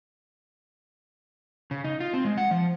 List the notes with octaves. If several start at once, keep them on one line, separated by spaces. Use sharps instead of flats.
C#3
D#4
F4
C4
G#3
F#5
F3